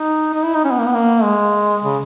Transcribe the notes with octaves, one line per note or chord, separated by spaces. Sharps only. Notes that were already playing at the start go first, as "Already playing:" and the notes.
Already playing: D#4
D#4
E4
D#4
C#4
B3
A#3
B3
A#3
G#3
C#3